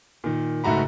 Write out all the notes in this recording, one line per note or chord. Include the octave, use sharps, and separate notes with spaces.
A#2 D#3
F#1 G#2 A3 F#4 A#5 B5